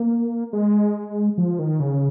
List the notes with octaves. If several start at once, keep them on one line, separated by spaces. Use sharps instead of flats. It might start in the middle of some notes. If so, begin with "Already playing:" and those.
Already playing: A#3
G#3
F3
D#3
C#3